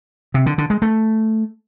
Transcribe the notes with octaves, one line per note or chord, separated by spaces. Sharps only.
C3
D3
D3
G#3
A3